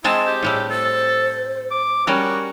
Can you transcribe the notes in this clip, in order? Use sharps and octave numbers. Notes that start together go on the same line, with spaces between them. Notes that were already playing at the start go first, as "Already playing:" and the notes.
G#3 C4 E4 D#5 A5
G4
A2 G3 A3 G#4
A4 C5
D6
G3 C#4 F#4 A#4